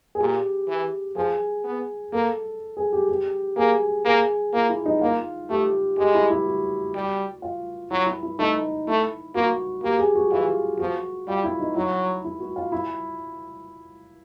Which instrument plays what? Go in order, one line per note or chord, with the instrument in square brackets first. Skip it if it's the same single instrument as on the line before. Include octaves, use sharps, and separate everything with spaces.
[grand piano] G#4
[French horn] A#2 [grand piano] G4
[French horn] E3
[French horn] F3 [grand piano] G#4
[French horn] B3
[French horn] A#3 [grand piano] A4
[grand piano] G#4
G4
G4
[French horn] A#3 [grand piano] G#4
[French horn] A#3 [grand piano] G#4
[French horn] A#3 [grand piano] F4
[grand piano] E4
D#4
[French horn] A#3 [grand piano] F4
[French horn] A3 [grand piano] G4
[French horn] G#3 [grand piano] G4
[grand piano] E4
E4
F#4
[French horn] G3
[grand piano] F4
[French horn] F#3 [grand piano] E4
[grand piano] E4
E4
[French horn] A3 [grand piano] D#4
[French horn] A3 [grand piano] E4
[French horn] A#3 [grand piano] F#4
[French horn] A#3 [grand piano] G4
[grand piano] G#4
F#4
[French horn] E3 [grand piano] F4
[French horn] F3 [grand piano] F#4
[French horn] G3 [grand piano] F4
[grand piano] E4
D#4
[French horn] F#3 [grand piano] E4
[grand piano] E4
F#4
F4
E4